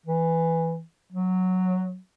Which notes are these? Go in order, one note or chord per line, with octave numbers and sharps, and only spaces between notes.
E3
F#3